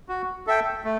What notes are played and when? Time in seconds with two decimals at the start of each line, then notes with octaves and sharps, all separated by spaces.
0.09 F#4
0.47 A4 E5 G5
0.84 A3